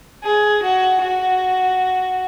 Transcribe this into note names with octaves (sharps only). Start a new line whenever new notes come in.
G#4
F#4
F#4